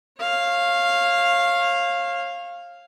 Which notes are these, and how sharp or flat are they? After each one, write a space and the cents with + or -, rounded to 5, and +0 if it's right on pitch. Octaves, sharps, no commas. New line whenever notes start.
C#5 -35 F5 +0